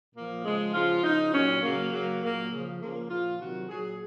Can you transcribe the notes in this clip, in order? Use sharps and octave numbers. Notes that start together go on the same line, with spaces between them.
A#2 F3 A#3
C#3 F3 G#3
C#3 F3 F4
C#3 F3 D#4
A#2 F#3 C#4
C#3 F#3 A#3
C#3 F#3 A#3
A#2 F#3 A#3
C#3 F3
C#3 F3 A#3
A#2 F3 F4
C3 D#3 F#3 F#4
A#2 F#3 G#4